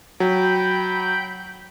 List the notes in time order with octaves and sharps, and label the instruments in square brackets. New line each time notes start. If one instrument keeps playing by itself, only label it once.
[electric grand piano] F#3 [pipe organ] G5 B5 G6